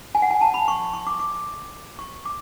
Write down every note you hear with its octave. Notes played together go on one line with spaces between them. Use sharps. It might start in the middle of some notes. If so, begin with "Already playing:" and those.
G#5
F#5
G#5
A5
B5
C#6
C#6
D6
D6
C#6
D6